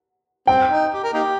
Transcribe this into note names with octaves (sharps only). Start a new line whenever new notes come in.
C4 G5
D#4
G4
A#4
A#3 D#4 G4